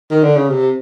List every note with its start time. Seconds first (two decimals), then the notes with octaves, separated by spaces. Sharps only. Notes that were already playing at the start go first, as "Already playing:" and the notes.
0.11 D#3
0.24 D3
0.37 C#3
0.50 C3